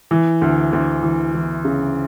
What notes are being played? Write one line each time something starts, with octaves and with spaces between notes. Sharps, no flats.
E3
D2
D2
E3
E3
C#3